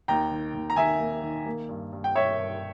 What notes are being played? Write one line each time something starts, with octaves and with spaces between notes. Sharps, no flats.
D#2 G5 A#5
D#3
D#2
A#5
D#3 E5 G#5
A#3
D#3
A#3
G2
G2
G5
G2 C#5 E5
G2